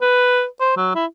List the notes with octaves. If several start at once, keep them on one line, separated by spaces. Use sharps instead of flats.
B4
C5
F#3
E4